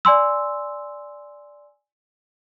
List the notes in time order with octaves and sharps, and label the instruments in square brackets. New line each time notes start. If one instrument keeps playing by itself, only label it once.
[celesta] D5 G#5 C6 E6